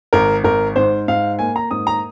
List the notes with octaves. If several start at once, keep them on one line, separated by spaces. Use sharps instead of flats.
G#1 A#4
G#1 A#4
G#2 C5
G#2 F5
A#3 G#5
A#5
G#2 D#6
A#5